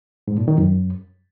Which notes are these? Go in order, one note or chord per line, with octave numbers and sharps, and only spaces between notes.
G#2
A#2
D#3
F#2